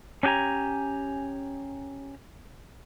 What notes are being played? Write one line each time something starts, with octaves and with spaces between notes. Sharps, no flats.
C#4 D4 G4 G#5 A#5